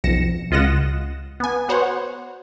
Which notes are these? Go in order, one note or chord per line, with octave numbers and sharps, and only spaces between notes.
B1 F2 A#6 C#7 E7
C#2 F4 D#5 F#5 A#6 E7
B3 G#5
B3 F#4 C5 C#5 F#5